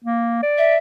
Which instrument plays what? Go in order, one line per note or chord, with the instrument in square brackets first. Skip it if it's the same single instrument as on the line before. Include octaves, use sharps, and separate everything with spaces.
[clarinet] A#3
D5
[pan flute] E5